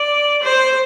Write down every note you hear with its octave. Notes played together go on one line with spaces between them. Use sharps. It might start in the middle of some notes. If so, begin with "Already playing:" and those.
Already playing: D5
C5